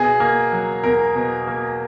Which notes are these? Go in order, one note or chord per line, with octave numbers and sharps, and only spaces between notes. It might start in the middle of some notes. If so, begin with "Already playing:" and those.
Already playing: B2 G#4
A#3
F#3
E2 A#4
B2
A#3